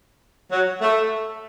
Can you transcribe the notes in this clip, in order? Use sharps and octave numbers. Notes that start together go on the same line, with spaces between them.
F#3
A3